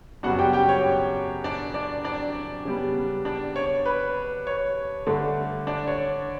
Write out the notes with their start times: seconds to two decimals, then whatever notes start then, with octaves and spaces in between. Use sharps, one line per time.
0.23 F#2 C#3 G3 B3 D4 F#4 F#5
0.39 G4 G5
0.53 G4 G5
0.69 C#5
1.44 D4 D5
1.74 D4 D5
2.05 D4 D5
2.65 C#3 G3 B3
3.25 D4 D5
3.56 C#5
3.86 B4
4.47 C#5
5.07 G2 D3 A3 D4
5.67 D4 D5
5.88 C#5